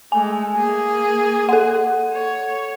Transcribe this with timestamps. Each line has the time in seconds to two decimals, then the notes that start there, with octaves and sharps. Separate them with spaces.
0.12 G#3 A3 G#5
0.55 A#3 G#4
1.49 A4 F#5
2.13 C#5